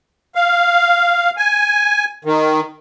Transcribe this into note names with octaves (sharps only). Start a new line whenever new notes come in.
F5
G#5
D#3